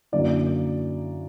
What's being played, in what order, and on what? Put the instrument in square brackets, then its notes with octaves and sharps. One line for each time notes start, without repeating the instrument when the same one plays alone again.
[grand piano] F#2 D3 A#3 E4 D5